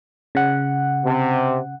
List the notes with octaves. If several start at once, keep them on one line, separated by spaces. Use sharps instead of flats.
C#3 F#5
C3